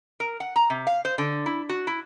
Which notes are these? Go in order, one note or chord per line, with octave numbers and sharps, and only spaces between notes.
A#4
F#5
A#5
C3
F5
C5
D3
E4
F#4
E4